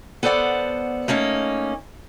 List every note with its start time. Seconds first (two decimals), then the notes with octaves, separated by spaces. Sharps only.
0.23 B3 A4 C5 D5 F#5
1.08 A3 A#3 C#4 D#4